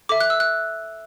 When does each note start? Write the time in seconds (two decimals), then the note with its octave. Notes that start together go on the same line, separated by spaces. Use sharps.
0.09 A4 E5 D6
0.20 F#6
0.30 E6
0.40 F#6